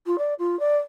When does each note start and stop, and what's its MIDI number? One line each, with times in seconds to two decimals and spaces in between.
0.06 0.16 65
0.18 0.33 74
0.38 0.58 65
0.59 0.78 74